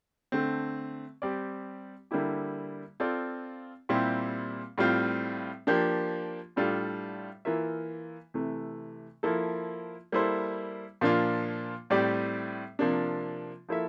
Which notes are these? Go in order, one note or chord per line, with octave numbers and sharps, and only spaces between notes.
D3 A3 C4
G3 C4 G4 D5
D3 G3 A#3 E4 G4
C4 F4 A4 D5
A#2 G3 C4 E4 G4
A2 G3 C4 F4
F3 A#3 D4 G4
A2 G3 D4 F4 A4
E3 A#3 F4 A#4 E5
C3 E3 A3
F3 A#3 E4 A4
G3 A#3 E4 A4 C5
A#2 F3 A#3 D4 F4
A2 G3 C4 G4 D5
C3 F3 A#3 D4
F3 A#3 E4 A4 E5